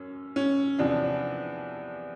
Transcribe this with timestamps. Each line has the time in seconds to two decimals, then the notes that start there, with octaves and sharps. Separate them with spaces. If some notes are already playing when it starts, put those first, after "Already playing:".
Already playing: F#2 C#4
0.36 C#4
0.79 E2 C3 F3 D4